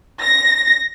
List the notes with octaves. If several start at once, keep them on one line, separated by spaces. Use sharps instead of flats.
A#6